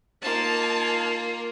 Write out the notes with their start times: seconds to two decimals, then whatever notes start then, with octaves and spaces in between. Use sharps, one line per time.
0.22 A#3 D#4 F4 A5